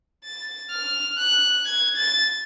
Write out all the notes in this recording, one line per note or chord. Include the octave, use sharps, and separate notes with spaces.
A6
F6
F#6
G#6
A6